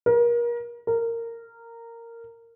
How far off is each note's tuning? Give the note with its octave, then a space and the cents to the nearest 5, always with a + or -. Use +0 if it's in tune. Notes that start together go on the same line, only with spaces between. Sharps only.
A#4 +30
A#4 -15